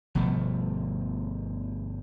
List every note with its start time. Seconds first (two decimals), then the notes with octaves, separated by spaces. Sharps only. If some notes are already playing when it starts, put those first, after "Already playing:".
0.15 G1 B2 F3 A3